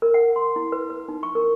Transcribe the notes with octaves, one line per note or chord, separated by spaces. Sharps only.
A#4
F#5
C6
E4
B4
B4
D#4
C#6
A#4